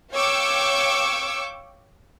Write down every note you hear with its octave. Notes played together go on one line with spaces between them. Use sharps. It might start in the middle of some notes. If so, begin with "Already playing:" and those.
C#5 F5 G5 C#6 D6 E6